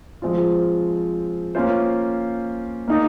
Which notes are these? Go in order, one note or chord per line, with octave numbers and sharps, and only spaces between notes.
F3 G#3 C4 F4
A#3 C#4 F4 C5
A#3 D#4 G#4